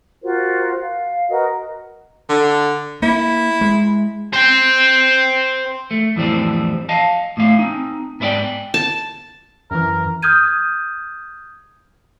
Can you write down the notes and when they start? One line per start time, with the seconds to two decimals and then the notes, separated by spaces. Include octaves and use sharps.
0.23 F4 F#4 A#4 C5
0.81 F5
1.30 F#4 A#4 B4 D#5
2.29 D3
3.02 A#3 E4
3.61 G#3
4.33 C5 G5
5.91 A3
6.16 F2 A2 E3 G3 C4
6.89 D#5 F5 A5
7.37 A2 A3 F5
7.59 C4 D#4
8.20 G#2 B3 E4 F#4 D5 G5
8.74 A5
9.71 F#2 E3 A#4
10.22 D#6 F6 G6 G#6 D#7